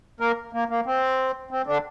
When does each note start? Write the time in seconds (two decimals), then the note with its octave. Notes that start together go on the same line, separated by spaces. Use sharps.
0.20 A#3 A#4
0.53 A#3
0.69 A#3
0.86 C4
1.51 C4
1.67 D3 D4